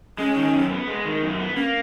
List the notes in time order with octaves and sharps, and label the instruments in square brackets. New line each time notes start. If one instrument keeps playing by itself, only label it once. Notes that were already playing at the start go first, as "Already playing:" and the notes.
[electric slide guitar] G#3 [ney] C#4
[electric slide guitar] D#3
F#2
B3
G#3
D#3
F#2
B3
[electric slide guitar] A#3 [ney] C#4